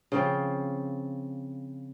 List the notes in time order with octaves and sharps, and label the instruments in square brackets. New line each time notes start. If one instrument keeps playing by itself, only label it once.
[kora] C#3 F3 C4